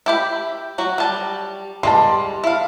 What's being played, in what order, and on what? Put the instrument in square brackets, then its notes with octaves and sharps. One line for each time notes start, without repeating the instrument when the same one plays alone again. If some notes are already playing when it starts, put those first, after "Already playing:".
[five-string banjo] E4 G4 B5
F#3 F#4
G3 A5
[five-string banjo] G3 G#3 [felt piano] A5 C6
[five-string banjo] E4 F5